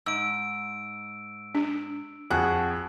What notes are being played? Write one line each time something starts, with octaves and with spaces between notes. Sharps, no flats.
G#2 E6 D7
D4
F2 F#4 G#4 F#6